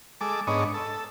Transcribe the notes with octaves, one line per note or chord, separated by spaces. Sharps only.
G#3 A4 D6
G#2 B3 D4 C#5 D#5
A4